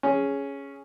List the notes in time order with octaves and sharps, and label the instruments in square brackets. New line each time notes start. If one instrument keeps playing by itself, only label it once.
[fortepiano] C#4 G#4